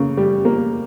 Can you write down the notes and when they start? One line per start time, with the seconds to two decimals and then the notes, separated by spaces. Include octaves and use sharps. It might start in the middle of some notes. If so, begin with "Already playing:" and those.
Already playing: C#3 A#3
0.17 G3
0.45 A#3